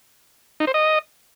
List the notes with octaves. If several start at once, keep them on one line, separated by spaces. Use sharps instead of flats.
D#4
C5
D#5